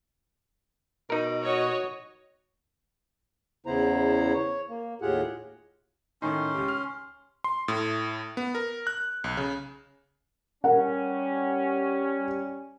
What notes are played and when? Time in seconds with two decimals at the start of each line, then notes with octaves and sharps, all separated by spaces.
1.10 B2 D#4 A#4
1.44 F#4 C#5 D#5
3.66 E2 C#3 B3 E4 C5 A#5
4.34 C#5
4.69 A#3
5.02 D#2 A2 F4 G4 G#4 F#5
6.22 A2 D#3 C#4 D#4 C6
6.55 C#2 G4
6.68 F6
7.44 C6
7.68 A2
8.37 B3
8.55 A#4
8.87 F#6
9.24 B1
9.37 C#3
10.64 G3 C#4 A#4 F#5